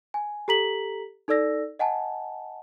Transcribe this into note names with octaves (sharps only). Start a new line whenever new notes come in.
G#5
G4 A4 A#5 B6 F#7
D#4 A4 D5 E6 A#6
D#5 F#5 G#5 A5